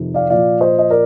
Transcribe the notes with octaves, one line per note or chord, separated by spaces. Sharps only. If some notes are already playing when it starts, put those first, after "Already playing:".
Already playing: F2 C3 D#3
D5 F5
A#2 F3 D5 F5
C5 D#5
D#5
A#4 D5